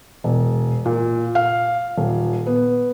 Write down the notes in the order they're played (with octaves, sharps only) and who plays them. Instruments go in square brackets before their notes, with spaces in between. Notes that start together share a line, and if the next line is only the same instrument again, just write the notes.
[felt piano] E1
A#2
F5
D#1
B3